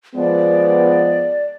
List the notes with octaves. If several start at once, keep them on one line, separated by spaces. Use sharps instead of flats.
F3 G#3 B3 D5